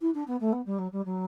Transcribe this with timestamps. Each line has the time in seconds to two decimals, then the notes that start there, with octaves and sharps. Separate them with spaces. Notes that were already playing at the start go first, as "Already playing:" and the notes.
0.01 E4
0.14 D4
0.28 B3
0.40 A3
0.53 B3
0.66 G3
0.79 F#3
0.93 G3
1.05 F#3